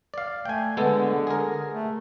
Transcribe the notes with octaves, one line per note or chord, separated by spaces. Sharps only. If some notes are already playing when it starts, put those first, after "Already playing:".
D5 F5
A3 G5 G#5
D3 G#3 B3 A4
G#4 A#4
A3